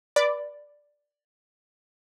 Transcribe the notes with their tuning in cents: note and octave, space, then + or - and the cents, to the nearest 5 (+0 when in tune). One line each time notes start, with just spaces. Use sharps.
B4 -35 D5 +0 B5 +15